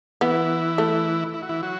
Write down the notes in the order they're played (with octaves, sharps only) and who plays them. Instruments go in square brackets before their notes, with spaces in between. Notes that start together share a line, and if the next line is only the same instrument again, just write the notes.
[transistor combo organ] E3 E4 [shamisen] B3
[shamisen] A3
[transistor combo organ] E4
F#4
E3 E4
F#3 F#4